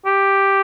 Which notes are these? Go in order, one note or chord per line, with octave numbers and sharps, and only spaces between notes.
G4